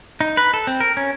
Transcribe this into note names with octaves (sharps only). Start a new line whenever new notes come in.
D#4
B4
A4
C4
A#4
C#4